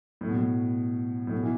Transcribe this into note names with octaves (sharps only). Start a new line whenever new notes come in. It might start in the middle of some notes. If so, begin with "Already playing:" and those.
A2
B2
A2
A2
B2
E3